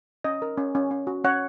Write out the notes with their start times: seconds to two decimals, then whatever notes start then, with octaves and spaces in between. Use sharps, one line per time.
0.24 C#4 D#5
0.42 A#4
0.58 C#4
0.75 C#4
0.91 C#4
1.07 F#4
1.24 C#4 C#5 F#5